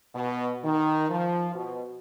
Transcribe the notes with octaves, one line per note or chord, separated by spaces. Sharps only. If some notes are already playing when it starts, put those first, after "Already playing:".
B2
D#3
F3
B2